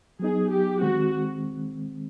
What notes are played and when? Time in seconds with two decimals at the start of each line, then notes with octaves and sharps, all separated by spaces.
0.20 F#3 B3 D#4 G#4
0.51 G4
0.80 D#3 G#3 C4 F#4